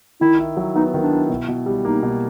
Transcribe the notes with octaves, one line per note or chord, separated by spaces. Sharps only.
D#3 E4
E4
F#3
B3 D#4
D#3
D4
E4
B2
B2
G3
A#3 D#4
B2